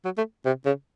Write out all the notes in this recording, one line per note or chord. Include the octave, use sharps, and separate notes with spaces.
F#3
A3
C3
C#3